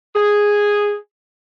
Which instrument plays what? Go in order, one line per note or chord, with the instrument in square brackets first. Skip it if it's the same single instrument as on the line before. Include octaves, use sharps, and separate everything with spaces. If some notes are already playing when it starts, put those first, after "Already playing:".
[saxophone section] G#4